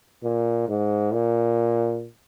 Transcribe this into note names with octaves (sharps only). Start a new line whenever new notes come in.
A#2
G#2
A#2